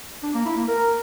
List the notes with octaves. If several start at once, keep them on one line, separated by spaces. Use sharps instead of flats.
D4
A#3
E4
A#3
A#4